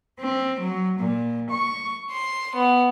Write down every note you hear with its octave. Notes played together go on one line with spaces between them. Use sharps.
C4
F#3
A#2
C#6
C6
B3